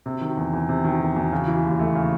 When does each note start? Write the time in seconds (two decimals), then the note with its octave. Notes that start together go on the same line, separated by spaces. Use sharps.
0.06 C3
0.21 D#3
0.37 E2
0.53 E2
0.69 C3
0.84 D#3
1.00 E2
1.16 E2
1.32 C#3
1.48 E3
1.64 D#2
1.79 A3
1.95 C#3